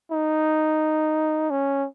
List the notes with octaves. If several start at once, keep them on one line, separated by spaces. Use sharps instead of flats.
D#4
C#4